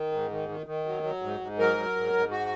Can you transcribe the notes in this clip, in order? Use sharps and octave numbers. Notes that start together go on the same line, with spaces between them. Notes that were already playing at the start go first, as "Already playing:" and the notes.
Already playing: D#3
G#2
D#3
D#3
D#3
F#3
F#3
G#2
G#2
F#3 A#4
F#3
G#2
G#2
F#4